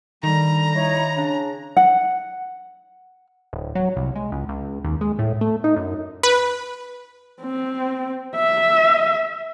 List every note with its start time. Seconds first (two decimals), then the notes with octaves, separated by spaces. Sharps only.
0.23 D3 D#3 G3 A#5
0.75 D#4 E4 C#5
1.15 C#3 D4
1.77 F#5
3.53 D1
3.75 F#3
3.97 C2
4.16 G#3
4.32 C#2
4.48 C#2
4.84 D#2
5.01 G#3
5.19 A2
5.41 A3
5.64 D#4
5.76 F#2
6.23 B4
7.42 C4
8.36 E5